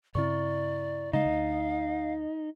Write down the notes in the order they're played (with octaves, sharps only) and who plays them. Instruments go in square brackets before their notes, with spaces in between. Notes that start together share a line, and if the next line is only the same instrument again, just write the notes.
[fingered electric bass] G2 C#3 C4 [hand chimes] E4 C#6 [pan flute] D5
[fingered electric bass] C#3 G#3 [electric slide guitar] D#4 [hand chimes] D#5 [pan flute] F5
[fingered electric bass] D2